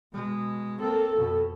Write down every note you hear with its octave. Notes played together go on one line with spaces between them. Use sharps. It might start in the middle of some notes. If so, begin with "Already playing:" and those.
B2 G#3
A#3 C4 A4
F2 B2